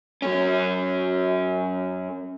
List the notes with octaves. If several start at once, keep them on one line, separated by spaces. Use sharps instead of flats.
F#2 C#4